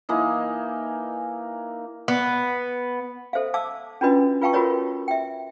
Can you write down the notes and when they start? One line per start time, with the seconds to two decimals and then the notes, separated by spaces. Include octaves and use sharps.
0.09 E3 A#3 D#4
2.08 B3
3.33 A4 C5 E5 F5
3.54 F5 A5 D6 E6
4.01 C#4 D4 F4 F#4 B4 D#5
4.41 F4 B4 F5 G5 A5 C#6
4.53 F4 F#4 A#4 B4 C#5 D#5
5.08 E5 G5